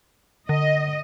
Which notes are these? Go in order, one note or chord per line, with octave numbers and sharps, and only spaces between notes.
D3 D#5